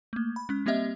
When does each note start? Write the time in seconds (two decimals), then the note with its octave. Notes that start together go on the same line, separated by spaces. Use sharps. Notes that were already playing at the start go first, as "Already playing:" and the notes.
0.13 A3 A#3
0.36 B5
0.49 G#3 C#4
0.66 G3 A#3 C4 G4 D#5 E5